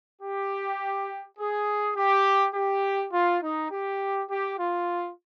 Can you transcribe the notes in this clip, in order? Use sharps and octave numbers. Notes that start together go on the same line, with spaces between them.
G4
G#4
G4
G4
F4
D#4
G4
G4
F4